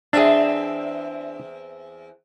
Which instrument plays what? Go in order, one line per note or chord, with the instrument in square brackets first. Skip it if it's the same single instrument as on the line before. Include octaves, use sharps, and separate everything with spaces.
[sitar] E2 C4 E5 [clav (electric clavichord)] D4 G#4